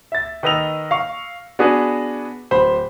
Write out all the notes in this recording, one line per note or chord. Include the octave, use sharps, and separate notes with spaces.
E5 A6
D#3 B4 D#5 E6 F7
F5 C#6
B3 D4 F#4 G#4 B4
D1 C5 B5